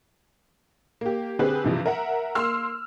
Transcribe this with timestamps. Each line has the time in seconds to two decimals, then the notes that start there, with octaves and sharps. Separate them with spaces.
1.01 A#3 G4
1.39 D3 C4 G4 G#4 B4
1.64 G2 C3 E3 F3
1.86 A#4 E5 F#5
2.35 A#3 C6 E6 F6